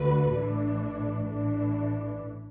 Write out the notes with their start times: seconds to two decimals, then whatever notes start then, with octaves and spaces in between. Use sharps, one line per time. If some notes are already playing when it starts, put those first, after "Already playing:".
Already playing: D2 D3 A3 F#4 B4
0.31 A1 A2 E3 D4
1.22 A1 A2 E3 D4